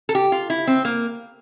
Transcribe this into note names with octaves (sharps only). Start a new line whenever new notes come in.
A4
G4
F4
E4
C4
A#3